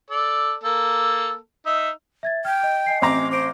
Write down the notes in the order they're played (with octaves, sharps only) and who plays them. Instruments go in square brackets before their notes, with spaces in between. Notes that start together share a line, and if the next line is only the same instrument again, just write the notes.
[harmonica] A4 D5
A#3 A4
D#4 E5
[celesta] E5 G#6 A6
[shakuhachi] G5 [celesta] F6 G#6
[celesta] D#5
D#5 G#5 C7
[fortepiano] A1 C4 A#5 [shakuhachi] D6
[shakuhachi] C5 [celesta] D6 D7